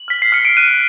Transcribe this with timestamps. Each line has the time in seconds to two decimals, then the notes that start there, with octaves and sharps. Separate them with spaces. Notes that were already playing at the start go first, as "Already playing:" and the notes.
Already playing: F#7
0.08 F6 B6
0.22 C7
0.32 F6 C#7
0.45 D7
0.57 F#6 D#7